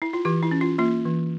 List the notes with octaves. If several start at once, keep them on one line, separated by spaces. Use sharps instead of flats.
E4
F4
E3 G4
E4
C#4
F4
A#3 F4
E3